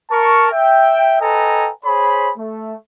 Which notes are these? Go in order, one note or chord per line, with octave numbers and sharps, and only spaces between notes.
A#4 A5 C#6
E5 G5
A4 B4 D#5 G5 G#5 A#5
G#4 C5 C#5 B5
A3